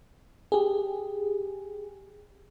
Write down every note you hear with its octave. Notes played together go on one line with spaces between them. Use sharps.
G4 G#4